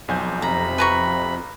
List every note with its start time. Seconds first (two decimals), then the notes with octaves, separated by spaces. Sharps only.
0.08 B1 F2 G#5 G6
0.42 C3 A#5 B5
0.78 B4 A#5 C#6